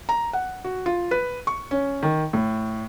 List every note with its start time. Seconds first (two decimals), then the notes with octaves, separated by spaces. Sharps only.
0.09 A#5
0.33 F#5
0.64 F#4
0.86 F4
1.11 B4
1.47 C#6
1.71 C#4
2.03 D#3
2.33 A2